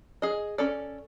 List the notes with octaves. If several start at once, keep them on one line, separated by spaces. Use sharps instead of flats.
G#4 D#5
C#4 A4 D5